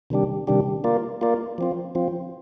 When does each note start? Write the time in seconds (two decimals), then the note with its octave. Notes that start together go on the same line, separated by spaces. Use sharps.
0.10 C3 D#3 G3 D4 G4
0.47 C3 D#3 G3 D4 G4
0.84 A#3 F4 A#4 D5
1.21 A#3 F4 A#4 D5
1.58 F3 C4 F4
1.95 F3 C4 F4